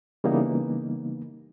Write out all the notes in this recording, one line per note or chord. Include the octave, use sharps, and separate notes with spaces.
C#3 E3 G3 A#3 B3 D#4